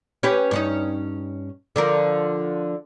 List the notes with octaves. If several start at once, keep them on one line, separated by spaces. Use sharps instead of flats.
C#4 G4 B4
G2 C#4 D#4
D3 F3 A#4